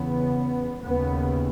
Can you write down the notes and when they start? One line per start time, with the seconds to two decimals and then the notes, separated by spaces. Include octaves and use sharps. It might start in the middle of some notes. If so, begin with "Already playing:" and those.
Already playing: E2 C#3 B3
0.84 D#2 C#3 B3